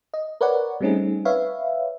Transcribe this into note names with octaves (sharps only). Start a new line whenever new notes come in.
D#5
A#4 B4 C#5 D5 F#5
G3 A3 C4 C#4 D#4 G#4
B4 C#5 E5 F5